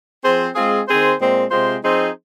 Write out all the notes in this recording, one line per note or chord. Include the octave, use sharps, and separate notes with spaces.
F3 C4 G#4 C5
G#3 C4 F4 G#4
D#3 C4 G#4 C5
A#2 G#3 C4
C3 G#3 C4 F4 C5
F3 C4 D#4 G#4 C5